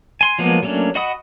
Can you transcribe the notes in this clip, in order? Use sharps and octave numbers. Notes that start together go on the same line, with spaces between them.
G#5 C6
F3 F#3 G#3 A#3 B3
F#3 A3 A#3 C#4 D4
F#4 D#5 F#5 B5 D#6